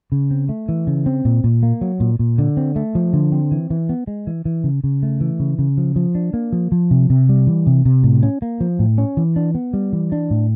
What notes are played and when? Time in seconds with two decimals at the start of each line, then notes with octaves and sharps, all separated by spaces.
0.12 C#3
0.31 C4
0.49 A3
0.69 E3
0.87 C#3
1.06 C4
1.25 A#2
1.44 A#2
1.63 A#3
1.81 F#3
2.00 A#2
2.19 A#2
2.38 D3
2.57 C4
2.76 A3
2.95 F3
3.13 D3
3.32 C4
3.52 E3
3.70 E3
3.89 B3
4.07 G#3
4.27 E3
4.45 E3
4.64 C#3
4.84 C#3
5.03 A3
5.21 E3
5.40 C#3
5.59 C#3
5.77 F3
5.96 F3
6.15 D4
6.34 A#3
6.53 F3
6.72 F3
6.91 C3
7.10 C3
7.29 G3
7.47 E3
7.67 C3
7.85 C3
8.03 A2
8.23 C#4
8.42 A#3
8.61 F3
8.79 A2
8.98 C#4
9.17 E3
9.36 D4
9.55 B3
9.74 G3
9.93 E3
10.12 D4
10.31 A2